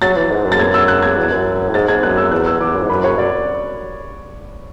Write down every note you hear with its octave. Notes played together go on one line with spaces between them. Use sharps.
F#3 A6
E3
G#2
F#2
A6
G#6
E6
F#6
G#6
E2
F#2
A2
G#2 A6
G#2 G#6
F#2 F#6
E6
E2 F#6
E6
E2 D6
F#2
G#2
F#2 B5
C#5
F#2 D5